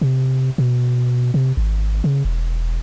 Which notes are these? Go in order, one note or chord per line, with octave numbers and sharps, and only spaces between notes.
C3
B2
C3
G#1
C#3
E1